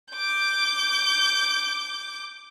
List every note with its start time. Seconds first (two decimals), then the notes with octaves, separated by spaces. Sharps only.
0.13 D6 G6